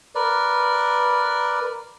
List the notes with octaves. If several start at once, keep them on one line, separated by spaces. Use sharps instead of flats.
A#4 B4 D5